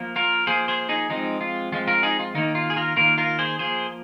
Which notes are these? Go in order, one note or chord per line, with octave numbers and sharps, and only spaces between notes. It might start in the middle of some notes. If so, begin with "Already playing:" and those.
Already playing: F3 A#3
F4 A#4
F3 A#3 G#4 C5
G#4 C5
D#4 G#4
F3 G#3 C4 D#4
F4
F3 G#3 C4 F4
F4 A#4
D#4 G#4
F4
D#3 A#3 D#4
F4
G#4
F4 A#4
D#3 A#3 F4 A#4
F4 A#4
G#4 C5
F3 A#3 G#4 C5